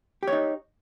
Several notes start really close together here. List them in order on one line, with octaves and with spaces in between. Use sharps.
G4 C#5 D#4